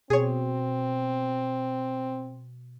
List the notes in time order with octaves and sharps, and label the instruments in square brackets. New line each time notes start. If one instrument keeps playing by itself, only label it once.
[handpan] B2 [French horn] C4 [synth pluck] G#4 C#5